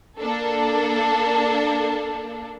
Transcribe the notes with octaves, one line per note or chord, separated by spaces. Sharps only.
A#3 D4 A4